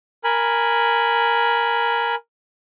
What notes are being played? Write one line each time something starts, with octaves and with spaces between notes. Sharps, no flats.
A#4 G#5 B5